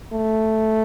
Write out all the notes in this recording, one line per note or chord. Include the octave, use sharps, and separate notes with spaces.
A3